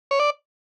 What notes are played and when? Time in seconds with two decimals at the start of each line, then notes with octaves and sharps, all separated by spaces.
0.11 C#5
0.20 D5